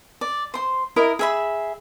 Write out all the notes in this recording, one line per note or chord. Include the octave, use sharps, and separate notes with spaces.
D5
C5 C6
E4 A#4 D#5
G#4 E5 B5